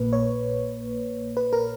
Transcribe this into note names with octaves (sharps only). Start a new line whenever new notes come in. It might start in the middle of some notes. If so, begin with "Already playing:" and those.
Already playing: A#1 A#2 A#3 B4
C#5
B4
A#4